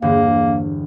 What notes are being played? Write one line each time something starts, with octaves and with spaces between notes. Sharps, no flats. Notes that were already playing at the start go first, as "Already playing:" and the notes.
E1 G2 D3 A#3